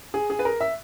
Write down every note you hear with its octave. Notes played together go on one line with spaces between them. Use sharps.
G#4
G#4
B4
A#4
E5